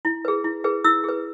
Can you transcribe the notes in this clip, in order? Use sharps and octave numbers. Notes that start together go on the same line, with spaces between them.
E4
G#4 B4
E4
G#4 B4
E4 E6
G#4 B4